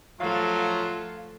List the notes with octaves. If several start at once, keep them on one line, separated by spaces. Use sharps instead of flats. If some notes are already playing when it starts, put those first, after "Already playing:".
F3 F#3 A3 F4 A4 F5